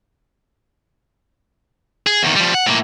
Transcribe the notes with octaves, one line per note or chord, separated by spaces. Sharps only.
G#4
E2 D#3
F3 G3
F#5
A2 A#3